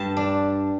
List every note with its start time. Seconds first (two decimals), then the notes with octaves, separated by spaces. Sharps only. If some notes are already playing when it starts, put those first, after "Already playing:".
Already playing: G2 A5
0.17 D4